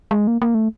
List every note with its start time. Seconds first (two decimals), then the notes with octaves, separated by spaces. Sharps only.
0.11 G#3
0.27 A#3
0.42 A#3
0.55 A3